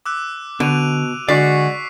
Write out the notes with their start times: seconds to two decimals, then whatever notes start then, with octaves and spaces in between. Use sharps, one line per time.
0.06 D6 E6 F#6
0.60 B2 D3 D7 D#7 F7
1.29 D3 G#3 F#4 D5 C#6 B6 C7